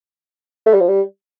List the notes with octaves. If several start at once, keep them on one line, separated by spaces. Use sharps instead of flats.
A3
G3
F3
G3